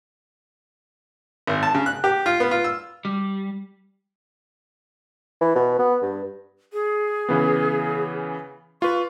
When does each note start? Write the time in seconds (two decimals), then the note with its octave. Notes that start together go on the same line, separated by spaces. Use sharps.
1.47 G#1
1.63 A5
1.74 C#3
1.86 F#6
2.04 G4
2.26 F4
2.40 B3
2.51 F4
2.64 E6
3.05 G3
5.41 E3
5.55 B2
5.79 B3
6.02 G2
6.73 G#4
7.29 C#3 E3 B3
8.82 F4 B4 C#6